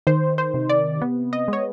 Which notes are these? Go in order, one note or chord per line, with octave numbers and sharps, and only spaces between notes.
D#3 C5
C5
C3
D5
B3
D#5
G#3 C#5